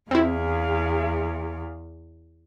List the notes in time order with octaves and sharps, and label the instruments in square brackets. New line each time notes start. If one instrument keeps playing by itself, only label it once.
[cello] E2 [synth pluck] C4 E4 [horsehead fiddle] G#4 F5